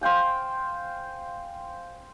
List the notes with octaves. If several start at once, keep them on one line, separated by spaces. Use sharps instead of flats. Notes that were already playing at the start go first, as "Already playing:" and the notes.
C5 F5 G5 G#5